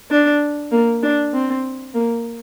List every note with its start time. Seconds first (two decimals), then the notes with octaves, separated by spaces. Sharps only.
0.11 D4
0.72 A#3
1.03 D4
1.34 C4
1.94 A#3